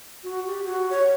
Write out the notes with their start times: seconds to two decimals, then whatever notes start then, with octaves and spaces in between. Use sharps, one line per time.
0.24 F#4
0.47 G4
0.66 F#4
0.90 C#5